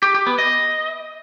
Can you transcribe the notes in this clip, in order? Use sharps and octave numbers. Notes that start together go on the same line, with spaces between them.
G4
G4
B3
D#5